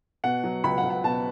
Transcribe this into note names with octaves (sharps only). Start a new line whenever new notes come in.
B2 F#5
F#3
C#2 B5
F#5
C#2
F#5
B2 A5